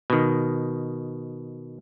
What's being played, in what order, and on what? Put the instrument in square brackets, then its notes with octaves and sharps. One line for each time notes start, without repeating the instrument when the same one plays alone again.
[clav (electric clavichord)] B2 D#3